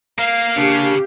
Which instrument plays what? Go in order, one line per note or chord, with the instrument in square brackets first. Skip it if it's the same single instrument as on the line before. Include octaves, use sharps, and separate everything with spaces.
[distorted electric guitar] A#3 [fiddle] F5
[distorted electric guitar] C#3 [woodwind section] A#3 D4 [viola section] G4